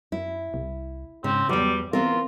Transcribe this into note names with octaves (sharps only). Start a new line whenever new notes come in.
F#2 E4
C2
G#2 C#3 C4
E2 G#2 F#3 G3
E3 B3 C4 F4 A#4